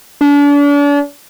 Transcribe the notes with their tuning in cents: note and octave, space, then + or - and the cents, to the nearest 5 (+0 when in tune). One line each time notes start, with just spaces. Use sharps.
D4 -40